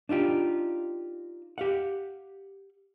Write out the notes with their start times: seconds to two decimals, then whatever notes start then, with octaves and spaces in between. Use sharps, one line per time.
0.09 D4 D#4 F4 G4
1.58 G4 F5 F#5